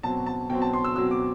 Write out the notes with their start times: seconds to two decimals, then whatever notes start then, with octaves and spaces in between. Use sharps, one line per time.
0.03 B2 F#3 C4 A5
0.26 A5
0.50 B2 F#3 C4 G5
0.62 A5
0.74 C6
0.84 E6
0.96 B2 F#3 C4 E6
1.11 D6